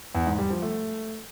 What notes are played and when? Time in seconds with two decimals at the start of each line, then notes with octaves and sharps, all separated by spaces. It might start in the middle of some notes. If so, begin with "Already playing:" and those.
0.15 E2
0.27 G#2
0.38 G3
0.50 F3
0.62 A3